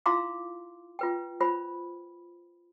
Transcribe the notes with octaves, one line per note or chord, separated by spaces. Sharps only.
E4 F4 F5 A#5 C6 D6
F4 B4 G5
F4 C5 B5